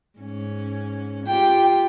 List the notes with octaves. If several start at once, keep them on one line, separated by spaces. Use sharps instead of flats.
G#2 C#4
F4 G4 G5